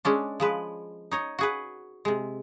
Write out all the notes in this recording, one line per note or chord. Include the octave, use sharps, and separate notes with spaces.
G#3 C#4 D4
F3 G#3 B4
D#4 C#5 D#5
F#4 G#4 B4
C3 G#3